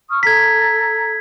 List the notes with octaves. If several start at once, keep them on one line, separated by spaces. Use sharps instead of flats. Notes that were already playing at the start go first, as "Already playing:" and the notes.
C#6 D#6 F6
A4 A#5 G#6 B6